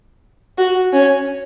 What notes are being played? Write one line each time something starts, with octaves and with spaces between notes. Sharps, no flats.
F#4
C#4